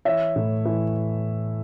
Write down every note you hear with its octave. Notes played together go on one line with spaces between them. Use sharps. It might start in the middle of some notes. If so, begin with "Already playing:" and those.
E3 C#5 E5
A2
E3